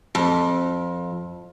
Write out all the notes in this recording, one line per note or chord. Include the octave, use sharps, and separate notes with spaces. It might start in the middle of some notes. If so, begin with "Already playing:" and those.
F2